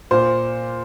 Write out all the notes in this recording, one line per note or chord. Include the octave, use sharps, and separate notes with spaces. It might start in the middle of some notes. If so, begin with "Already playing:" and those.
A#2 C5